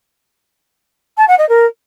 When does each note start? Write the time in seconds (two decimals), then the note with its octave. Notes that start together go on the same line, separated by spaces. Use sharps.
1.17 A5
1.28 F#5
1.38 D#5
1.49 A#4